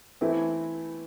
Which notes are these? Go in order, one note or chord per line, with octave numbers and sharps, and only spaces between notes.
E3 A3 C4 E4 B4